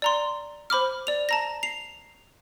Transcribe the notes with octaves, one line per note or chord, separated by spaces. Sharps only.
D5 A#5 C6
C5 B5 D6 F6
D5 F7
A5 A#5 A#6
C7 F7